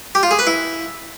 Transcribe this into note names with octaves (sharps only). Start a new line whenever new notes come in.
G4
F4
G#4
B4
E4